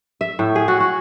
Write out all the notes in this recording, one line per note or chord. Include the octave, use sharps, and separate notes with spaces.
E5
A2
G#4
F#4
F#4